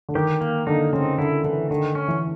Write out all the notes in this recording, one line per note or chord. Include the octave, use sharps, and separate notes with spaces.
D3
D#3 G4
A#3
D3 D#4
C#3 C4
D3 E4
D3 E3
D3 D#3
C#4
E3